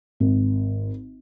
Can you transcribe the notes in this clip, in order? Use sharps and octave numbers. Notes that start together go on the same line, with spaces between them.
G#1